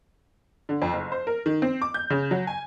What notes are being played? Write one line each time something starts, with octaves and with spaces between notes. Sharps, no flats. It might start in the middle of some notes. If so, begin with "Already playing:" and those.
D3
F2
F#1
C5
A#4
D#3
C4
D6
G6
C#3
F#3
G#5